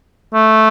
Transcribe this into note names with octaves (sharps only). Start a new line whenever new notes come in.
A3